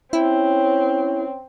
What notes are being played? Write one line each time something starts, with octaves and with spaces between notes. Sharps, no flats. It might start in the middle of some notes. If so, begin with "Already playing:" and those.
C4 C#4 E4 C#5